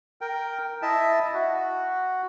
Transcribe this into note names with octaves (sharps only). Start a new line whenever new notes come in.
A#4 G5
E4 D#5 E5 A5
F#4